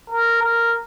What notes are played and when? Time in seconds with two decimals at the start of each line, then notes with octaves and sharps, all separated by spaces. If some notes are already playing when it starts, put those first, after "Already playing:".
0.10 A#4
0.42 A#4